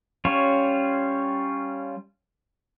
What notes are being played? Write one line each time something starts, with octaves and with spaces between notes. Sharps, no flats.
G3 C#4 F4 C#5